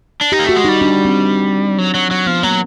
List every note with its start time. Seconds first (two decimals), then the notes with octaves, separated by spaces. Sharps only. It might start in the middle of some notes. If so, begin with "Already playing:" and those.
0.21 D4
0.32 D#4 G4
0.39 A#3
0.44 A3 F#4
0.57 G#3
0.65 D#4
0.69 G3
0.81 D4
1.05 C4
1.78 F#3
1.94 F#3
2.11 F#3
2.27 F3 B3
2.43 F#3 A#3